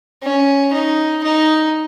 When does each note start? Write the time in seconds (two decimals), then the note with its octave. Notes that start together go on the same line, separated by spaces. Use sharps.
0.23 C#4
0.73 D#4
1.24 D#4